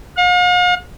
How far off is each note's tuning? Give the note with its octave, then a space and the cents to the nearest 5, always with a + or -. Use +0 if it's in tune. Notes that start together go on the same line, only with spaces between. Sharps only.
F5 +45